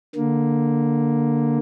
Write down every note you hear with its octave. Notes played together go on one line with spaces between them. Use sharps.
D3 A#3